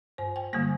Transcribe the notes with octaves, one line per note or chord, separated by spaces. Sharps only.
G2 C5
G5
D3 G3 A#3 G#5